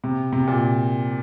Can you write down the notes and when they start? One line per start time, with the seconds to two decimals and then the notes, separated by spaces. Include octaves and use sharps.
0.04 C3
0.32 C3
0.47 A#2